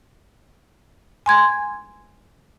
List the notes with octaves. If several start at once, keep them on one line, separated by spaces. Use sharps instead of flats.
G#5 C6 G#6